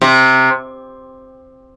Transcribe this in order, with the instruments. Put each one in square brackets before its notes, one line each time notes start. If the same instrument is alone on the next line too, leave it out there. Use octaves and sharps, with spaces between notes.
[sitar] C3